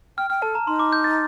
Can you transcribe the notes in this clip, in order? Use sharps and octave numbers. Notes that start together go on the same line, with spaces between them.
G5 F6
G5 F6
A4 A5
A#5
D#4 C6
D6
G6
A6